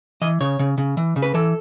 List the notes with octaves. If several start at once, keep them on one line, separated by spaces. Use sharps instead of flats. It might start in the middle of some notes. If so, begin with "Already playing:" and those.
E3 D#5
C#3 C#5
C#3
C#3
E3
C#3
B4
E3 A4